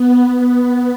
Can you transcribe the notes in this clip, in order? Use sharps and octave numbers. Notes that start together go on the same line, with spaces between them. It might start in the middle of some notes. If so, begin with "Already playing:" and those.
Already playing: B3
B3